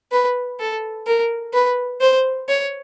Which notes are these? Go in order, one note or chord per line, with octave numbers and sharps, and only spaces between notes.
B4
A4
A#4
B4
C5
C#5